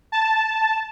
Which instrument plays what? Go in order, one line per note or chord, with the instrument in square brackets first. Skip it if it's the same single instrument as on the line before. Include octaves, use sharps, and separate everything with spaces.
[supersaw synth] A5